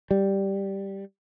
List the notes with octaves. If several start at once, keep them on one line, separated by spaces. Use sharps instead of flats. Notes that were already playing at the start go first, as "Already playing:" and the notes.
G3